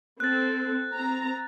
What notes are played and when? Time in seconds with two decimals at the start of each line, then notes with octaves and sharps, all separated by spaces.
0.20 C4 A4 F#6 A6
0.93 C4 A#5